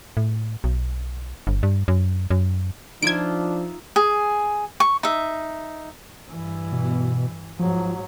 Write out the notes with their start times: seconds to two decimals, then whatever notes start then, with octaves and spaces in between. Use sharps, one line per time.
0.17 A2
0.64 B1
1.47 G1
1.63 G2
1.88 F#2
2.31 F#2
3.03 F3 D4 D#4 F4 E5 G#6 D7
3.96 G#4
4.80 C#6
5.03 D#4 E5
6.30 G2 E3
6.73 B2
7.59 G#2 F3 F#3